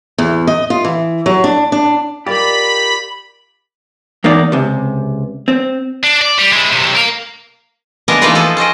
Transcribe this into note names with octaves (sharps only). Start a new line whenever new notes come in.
E2
D#5
F4
E3
F#3
D4
D4
F4 G4 A#4 D5 D#5 B5
E2 A#3 D#4 D5
C#2 C3
C4
D4
D5
G3
G#3 E4
B1 C3
A#4 F5
C#3 G#3 B3 D4 G#4 A#4
E3 A3 A#3 D#4 F4 B4
F3 G#4 A4
C#4 C5 D#5 G5